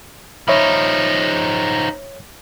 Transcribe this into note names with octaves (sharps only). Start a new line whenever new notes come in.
F3 D#4 C#5 E5 B5